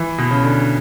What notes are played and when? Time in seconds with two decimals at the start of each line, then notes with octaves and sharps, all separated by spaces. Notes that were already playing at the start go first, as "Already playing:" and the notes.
Already playing: E3
0.18 B2
0.31 C#3
0.43 D3